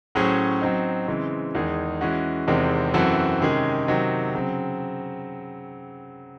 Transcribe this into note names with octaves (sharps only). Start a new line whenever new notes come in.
A2 F#3 C#4 G#4 C5
F#3 C4 D#4
C#3 E3 G#3 C4
E2 D#3 G#3 D#4 G#4
E3 G#3 C#4 F#4
E2 C3 D#3 G#3 C4
F#2 E3 C4 F#4 A4
C3 D#3 G#3 C#4 G#4
C3 D#3 F#3 C4 D#4
C#3 F#3 C4